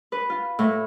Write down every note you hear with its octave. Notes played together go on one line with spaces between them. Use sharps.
B4
F4
A2